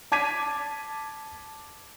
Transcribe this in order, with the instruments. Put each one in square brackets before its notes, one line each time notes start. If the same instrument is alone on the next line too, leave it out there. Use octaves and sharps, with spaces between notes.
[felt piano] A5 D6 G#6 B6 D#7